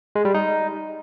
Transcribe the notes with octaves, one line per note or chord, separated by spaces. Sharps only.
G#3
G3
D#4